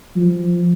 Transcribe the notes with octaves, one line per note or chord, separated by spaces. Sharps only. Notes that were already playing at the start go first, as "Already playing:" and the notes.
F3